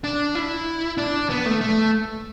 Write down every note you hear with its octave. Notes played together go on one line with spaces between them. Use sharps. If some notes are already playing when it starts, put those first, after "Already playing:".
D4
E4
D4
B3
A3
A3